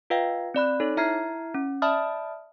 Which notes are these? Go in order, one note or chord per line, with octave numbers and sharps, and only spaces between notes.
F4 B4 D#5 F5 G5
C4 D5 B5 F#6
D#4 A4 C#5
E4 E5 A#5 F6 G#6 C7
C#4
D5 E5 A5 B5 D#6 F6